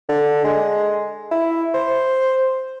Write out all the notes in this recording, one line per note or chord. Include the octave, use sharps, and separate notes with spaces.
D3
G#3
E4
C5